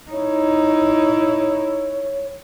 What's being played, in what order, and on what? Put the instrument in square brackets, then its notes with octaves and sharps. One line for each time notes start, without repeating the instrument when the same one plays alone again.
[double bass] D#4 E4 [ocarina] C#5